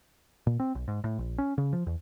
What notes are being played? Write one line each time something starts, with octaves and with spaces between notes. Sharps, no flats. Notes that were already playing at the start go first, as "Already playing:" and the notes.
A#2
C4
B1
G#2
A2
A#1
C#4
C#3
F3
E2